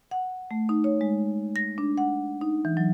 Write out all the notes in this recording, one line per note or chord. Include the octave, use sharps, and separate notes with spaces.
F#5
A3
D#4
C#5
G#3
A#6
D4
F#5
D#4
E3
F#3